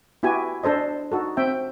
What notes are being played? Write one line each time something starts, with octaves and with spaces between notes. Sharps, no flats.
B3 E4 F#4 G4 G#5
D4 A4 C5 D#5
D#4 F#4 A4
C4 E5 G5